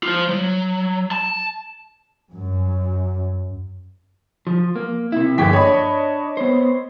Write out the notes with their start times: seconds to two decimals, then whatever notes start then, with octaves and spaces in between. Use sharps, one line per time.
0.03 F4 C5
0.29 F#3
1.11 A5
2.34 F#2
4.47 F3
4.76 A#3
5.12 C3 E4
5.38 G1 F3 A#3 G#4 G5 B6
5.53 D4 C#5 D#5 B5
6.37 B3 C5